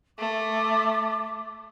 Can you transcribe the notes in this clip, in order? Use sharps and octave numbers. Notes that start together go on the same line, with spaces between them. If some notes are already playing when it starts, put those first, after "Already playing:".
A3 D6